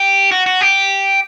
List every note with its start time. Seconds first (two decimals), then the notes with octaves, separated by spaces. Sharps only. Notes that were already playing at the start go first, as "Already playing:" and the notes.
Already playing: G4
0.31 F#4
0.46 F#4
0.61 G4